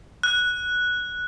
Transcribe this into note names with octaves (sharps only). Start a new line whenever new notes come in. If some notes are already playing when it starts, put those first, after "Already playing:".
F#6